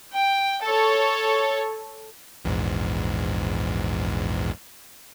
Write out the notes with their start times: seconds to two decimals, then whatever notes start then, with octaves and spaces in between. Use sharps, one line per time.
0.15 G5
0.62 A4 C#5
2.45 A#1 E2 G#2